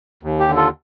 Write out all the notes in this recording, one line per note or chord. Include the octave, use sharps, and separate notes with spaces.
D#2
G4
D3
F4 A4